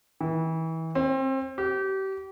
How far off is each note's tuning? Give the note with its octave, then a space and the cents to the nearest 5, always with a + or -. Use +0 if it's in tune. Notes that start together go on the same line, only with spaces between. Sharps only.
E3 -30
C4 +30
G4 -30